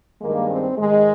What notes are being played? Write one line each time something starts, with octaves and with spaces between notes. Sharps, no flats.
G2 D#3 G#3 A#3
C4
G#2 D#3 G#3